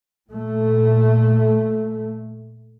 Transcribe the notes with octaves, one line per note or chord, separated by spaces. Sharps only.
A#2 A3